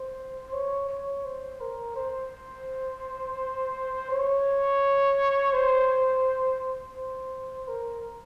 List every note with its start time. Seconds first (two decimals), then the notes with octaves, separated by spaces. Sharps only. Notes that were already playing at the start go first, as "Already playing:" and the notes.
Already playing: C5
0.53 C#5
0.89 C#5
1.25 C5
1.61 A#4
1.96 C5
4.11 C#5
5.53 C5
6.97 C5
7.68 A#4